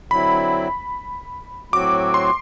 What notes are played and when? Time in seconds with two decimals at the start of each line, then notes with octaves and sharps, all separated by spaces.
0.11 D3 F#3 C4 E4 B5
1.73 A2 F#3 C4 F#4 D6
2.14 C6